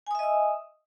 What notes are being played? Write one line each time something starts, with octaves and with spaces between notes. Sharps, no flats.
D#5 E5 G#5 D#6 E6